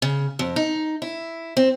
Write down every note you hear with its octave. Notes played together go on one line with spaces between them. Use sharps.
C#3
F2
D#4
E4
C4